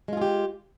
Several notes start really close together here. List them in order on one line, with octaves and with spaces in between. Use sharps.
G#3 F4 G#4 G4